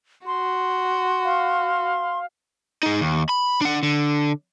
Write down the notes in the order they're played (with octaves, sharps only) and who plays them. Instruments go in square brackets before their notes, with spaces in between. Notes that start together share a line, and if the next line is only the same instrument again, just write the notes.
[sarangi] F#4 [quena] C6
[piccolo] F5
[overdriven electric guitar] D#4 G#4
D#2
B5
D4 F#5
D3